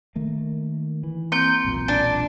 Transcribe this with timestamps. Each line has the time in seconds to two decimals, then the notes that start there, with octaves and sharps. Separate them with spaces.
0.16 D#3 A3 A#3
1.03 E3
1.32 A#3 C4 G6
1.65 E1 B1 A#2
1.88 D4 D5